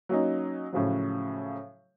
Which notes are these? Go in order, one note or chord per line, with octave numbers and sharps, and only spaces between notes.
F#3 A#3 C#4 D#4
A2 C#3 F3 F#3